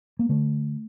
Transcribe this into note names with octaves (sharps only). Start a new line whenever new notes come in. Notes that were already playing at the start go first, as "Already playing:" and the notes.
A#3
D3 A3